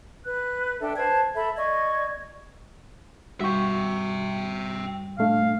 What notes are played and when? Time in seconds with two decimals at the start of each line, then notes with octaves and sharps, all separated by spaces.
0.24 B4 F#6
0.81 D4 A4 E5 G5
0.98 B4 C5 A5 G#6
1.35 A4 E5 B5
1.57 D5 D#5 C#6 G#6
3.40 G2 F#4 E5 G5 C#6
5.18 A#2 A3 D4 F5